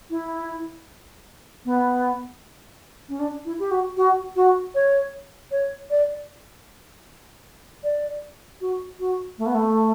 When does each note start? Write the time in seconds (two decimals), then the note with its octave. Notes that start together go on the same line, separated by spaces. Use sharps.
0.10 E4
1.65 B3
3.09 C#4
3.20 D4
3.45 E4
3.59 G4
3.71 F#4
3.97 F#4
4.36 F#4
4.75 C#5
5.51 C#5
5.90 D5
7.84 D5
8.61 F#4
9.00 F#4
9.38 A3
9.46 B3
9.54 A3